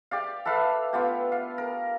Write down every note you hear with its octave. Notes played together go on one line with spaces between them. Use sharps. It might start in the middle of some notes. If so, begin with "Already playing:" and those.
G4 D5 F5
A4 B4 E5 F5
B3 F4 G4
F5
A#4